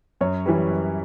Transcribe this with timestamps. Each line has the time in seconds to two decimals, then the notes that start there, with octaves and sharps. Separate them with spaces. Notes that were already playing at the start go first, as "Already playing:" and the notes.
0.21 F#2 C#5
0.46 E3 G3 B4
0.70 F#2